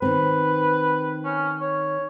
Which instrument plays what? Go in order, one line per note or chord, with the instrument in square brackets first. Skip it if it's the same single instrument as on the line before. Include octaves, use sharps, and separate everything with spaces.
[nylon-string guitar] D#3 C4 [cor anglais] B4
[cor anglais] C#4
C#5